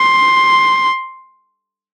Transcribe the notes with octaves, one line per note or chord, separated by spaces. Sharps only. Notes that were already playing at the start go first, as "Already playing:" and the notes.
Already playing: C6